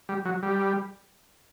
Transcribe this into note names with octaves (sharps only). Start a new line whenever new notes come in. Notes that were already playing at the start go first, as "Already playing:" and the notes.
G3
F#3
G3